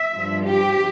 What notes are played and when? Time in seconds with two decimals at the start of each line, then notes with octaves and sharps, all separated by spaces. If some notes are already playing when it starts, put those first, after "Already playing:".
Already playing: E5
0.13 G2 F3
0.44 G4